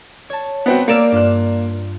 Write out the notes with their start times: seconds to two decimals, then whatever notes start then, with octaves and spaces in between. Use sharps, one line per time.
0.30 C#5 A5
0.66 B3 C4 F#4
0.88 A#3 A#4 D5 E6 E7
1.12 G2 F4 F#6